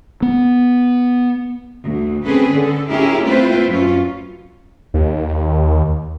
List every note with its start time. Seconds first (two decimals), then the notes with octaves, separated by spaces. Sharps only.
0.22 B3
1.84 D2
2.24 C4 C#4 G#4 A4 B4
2.56 D3 A4
2.90 C#4 E4 F4 G4 G#4 A#4
3.25 A3 C4 E4 F4 B4 C5
3.68 F#2 C#4 F4
4.94 D#2